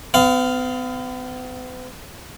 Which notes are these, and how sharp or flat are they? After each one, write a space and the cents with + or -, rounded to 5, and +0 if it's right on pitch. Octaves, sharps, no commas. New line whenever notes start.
B3 +45 F5 +0